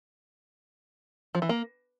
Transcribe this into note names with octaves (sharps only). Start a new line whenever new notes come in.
F3
E3
A#3